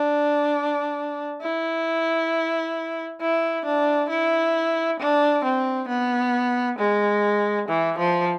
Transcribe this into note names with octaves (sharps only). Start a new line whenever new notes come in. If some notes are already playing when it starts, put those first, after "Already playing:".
Already playing: D4
E4
E4
D4
E4
D4
C4
B3
G#3
E3
F3